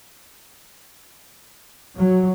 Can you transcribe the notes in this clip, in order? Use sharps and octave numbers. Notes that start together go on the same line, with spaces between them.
F#3